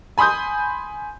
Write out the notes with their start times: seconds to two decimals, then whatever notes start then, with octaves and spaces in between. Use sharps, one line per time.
0.18 G#5 B5 C6 D#6 G6